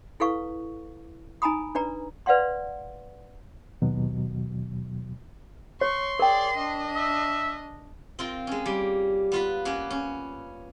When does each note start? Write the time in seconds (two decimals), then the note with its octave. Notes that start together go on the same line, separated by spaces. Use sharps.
0.20 E4 A4 B4 F5 C#6
1.42 D#4 G#5 A#5 B5 D#6
1.75 D4 B4 D5 A#5
2.26 B4 D5 F5 F#5 C6
3.82 D#2 B2 F#3
5.81 C#5 C6 C#6
6.19 G#4 A#4 D5 G5
6.57 D4 D#5
6.95 E5
8.19 C4 F4 A#4
8.47 G#3 C#4
8.65 G3 A#3
9.32 B3 F4 B4
9.65 A#3 B3 C#4
9.90 C#4